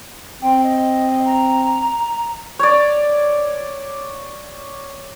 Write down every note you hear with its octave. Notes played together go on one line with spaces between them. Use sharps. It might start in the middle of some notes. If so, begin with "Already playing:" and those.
C4 G5
D#5
A#5
C#5 D5